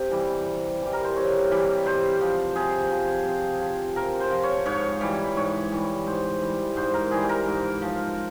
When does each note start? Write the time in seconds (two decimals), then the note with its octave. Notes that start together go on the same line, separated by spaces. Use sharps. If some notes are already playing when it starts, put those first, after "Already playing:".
Already playing: C3
0.10 E3 G3
0.46 C3
0.81 E3 G3
0.93 A#4
1.04 C5
1.16 C3 C#5
1.51 E3 G3
1.85 C3 C5
2.21 F3
2.55 C3 G#4
2.91 F3
3.25 C3
3.61 F3
3.96 C3 A#4
4.20 C5
4.31 F3
4.43 C#5
4.66 G#2 C#5
5.01 E3 G3
5.36 G#2 C#5
5.72 E3 G3
6.06 G#2 C5
6.42 E3 G3
6.76 G#2 C5
6.94 A#4
7.11 E3 G3 G#4
7.29 A#4
7.46 G#2
7.82 F3